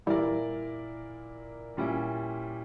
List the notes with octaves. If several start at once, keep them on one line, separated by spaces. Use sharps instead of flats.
A#2 E3 G3 A#3 E4 A#4 D5
A#2 G3 C#4 E4